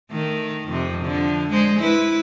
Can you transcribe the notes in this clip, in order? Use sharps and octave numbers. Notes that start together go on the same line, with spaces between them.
D#3 A3
F2 C3
D3 F3
G#3 C5
E4 B4